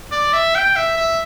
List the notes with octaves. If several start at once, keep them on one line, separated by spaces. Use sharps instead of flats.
D5
E5
G5
E5
E5